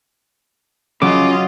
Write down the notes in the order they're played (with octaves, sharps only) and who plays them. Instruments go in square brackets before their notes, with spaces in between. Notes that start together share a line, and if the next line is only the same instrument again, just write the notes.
[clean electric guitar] C#3 [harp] F#3 [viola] F4 D#5 [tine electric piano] D6